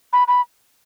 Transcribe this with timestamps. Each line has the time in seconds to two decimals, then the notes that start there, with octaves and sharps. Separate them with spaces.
0.13 B5
0.28 B5